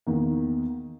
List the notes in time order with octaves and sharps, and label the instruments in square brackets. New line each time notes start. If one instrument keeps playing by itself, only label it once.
[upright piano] E2 D#3 A#3